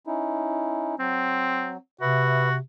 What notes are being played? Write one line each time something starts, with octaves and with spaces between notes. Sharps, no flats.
C#4 D#4 E4
F#3 C4
C3 F#4 B4 E5